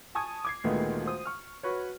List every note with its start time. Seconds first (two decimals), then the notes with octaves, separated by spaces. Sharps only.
0.15 G#5 A5 C#6 D#6 G#6
0.45 D6 G#6 C7
0.64 D2 A#2 D#3 G#3 A3 B3
1.06 C5 D#6
1.26 C#6 F6
1.63 F#4 B4 C#5